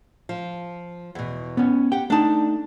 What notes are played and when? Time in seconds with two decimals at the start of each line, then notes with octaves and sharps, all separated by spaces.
0.29 F3
1.15 E2 B2
1.57 B3 C#4
1.92 G4 F#5 G5
2.10 A3 D4 D#4 A5